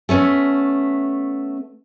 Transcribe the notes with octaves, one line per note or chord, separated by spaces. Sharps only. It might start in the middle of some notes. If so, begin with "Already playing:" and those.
A3 B3 C#4